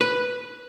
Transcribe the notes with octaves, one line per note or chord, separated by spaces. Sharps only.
B4